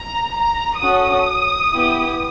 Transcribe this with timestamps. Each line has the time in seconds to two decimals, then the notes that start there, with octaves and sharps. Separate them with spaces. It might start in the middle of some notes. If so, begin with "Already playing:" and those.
Already playing: A#5
0.36 A#5
0.81 C#4 F#4 A4 D#6
1.73 B3 E4 G4